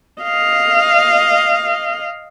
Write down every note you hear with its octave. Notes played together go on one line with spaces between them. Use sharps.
D#5 F5